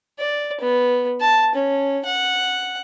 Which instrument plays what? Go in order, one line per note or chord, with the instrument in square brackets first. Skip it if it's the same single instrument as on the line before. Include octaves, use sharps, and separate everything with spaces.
[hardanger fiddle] D5
B3
A5
C#4
F#5